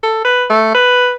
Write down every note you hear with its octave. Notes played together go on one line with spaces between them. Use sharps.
A4
B4
A3
B4